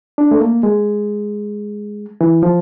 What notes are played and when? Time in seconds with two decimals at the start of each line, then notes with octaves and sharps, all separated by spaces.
0.18 D4
0.31 A3
0.41 A#3
0.63 G#3
2.21 E3
2.43 F3